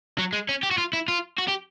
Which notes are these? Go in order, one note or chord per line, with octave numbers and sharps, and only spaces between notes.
F#3
G#3
C#4
G4
F#4
F4
E4
F4
F#4
G4